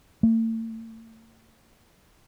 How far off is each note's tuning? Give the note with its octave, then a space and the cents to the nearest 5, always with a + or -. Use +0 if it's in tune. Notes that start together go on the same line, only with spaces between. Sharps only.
A3 +40